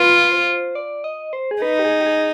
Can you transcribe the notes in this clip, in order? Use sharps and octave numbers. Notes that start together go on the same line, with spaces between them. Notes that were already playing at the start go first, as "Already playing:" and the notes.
Already playing: F4 B4
C5
D5
D#5
C5
G#4
D#4 B4
G4
G#4
G4
G#4